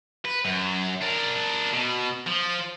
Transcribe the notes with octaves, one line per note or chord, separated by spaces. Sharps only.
B4
F#2
D4 A#4
B2
F3